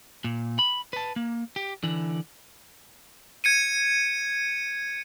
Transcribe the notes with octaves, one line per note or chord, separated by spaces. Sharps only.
A#2
B5
B4 A5
A#3
G4
D3 E3
G#6 C#7 D#7